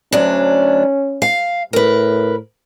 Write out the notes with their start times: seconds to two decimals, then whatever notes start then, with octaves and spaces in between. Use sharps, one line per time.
0.12 D2 F#3 C#4 D4
1.22 F5
1.73 A2 A#4 B4